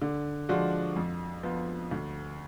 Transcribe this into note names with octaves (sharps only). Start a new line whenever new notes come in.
D3
F3 G#3 D4 F#4
F2
F3 B3
D2